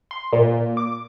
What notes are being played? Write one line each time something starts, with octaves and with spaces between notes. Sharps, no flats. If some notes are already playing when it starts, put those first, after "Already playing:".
C6
A#2
D6